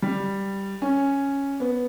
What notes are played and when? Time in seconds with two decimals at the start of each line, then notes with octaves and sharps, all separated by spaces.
0.02 G3
0.82 C#4
1.60 B3